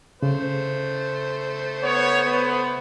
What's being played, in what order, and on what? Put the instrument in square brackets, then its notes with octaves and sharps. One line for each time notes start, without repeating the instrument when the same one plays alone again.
[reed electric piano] C#3 [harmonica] A3 C5
[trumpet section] B3 C#5
B3